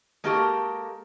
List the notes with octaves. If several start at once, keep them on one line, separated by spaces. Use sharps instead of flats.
G#3 A#3 F#4 G4 A4 A#4